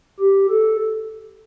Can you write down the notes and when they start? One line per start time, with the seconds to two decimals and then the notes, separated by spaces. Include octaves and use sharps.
0.20 G4
0.50 A4